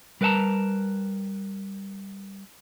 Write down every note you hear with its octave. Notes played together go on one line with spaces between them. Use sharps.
G3 A#4 B4 D#5 A5 A#5